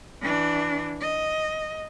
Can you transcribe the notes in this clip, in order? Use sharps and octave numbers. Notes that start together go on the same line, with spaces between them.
E3 D4
D#5